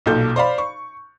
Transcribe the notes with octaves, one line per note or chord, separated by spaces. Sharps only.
B1 A#2 A4 G6
C5 D5 F5 B5
C#6